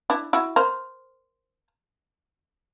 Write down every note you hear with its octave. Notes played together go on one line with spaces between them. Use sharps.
D4 E4
E4 F#4
A#4 C5